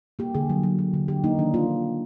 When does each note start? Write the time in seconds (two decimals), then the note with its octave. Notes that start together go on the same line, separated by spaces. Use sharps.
0.19 A#3 G4
0.35 D3 G#4
0.49 F#3
0.63 F#3
0.79 F#3
0.94 D3
1.08 F#3 G4
1.24 A#3 D#4
1.39 D#3 D4
1.54 A#3 F4